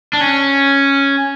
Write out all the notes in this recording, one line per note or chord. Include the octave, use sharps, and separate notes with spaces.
D4
C#4